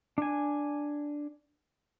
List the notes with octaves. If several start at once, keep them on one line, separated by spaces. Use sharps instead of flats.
D4 G#5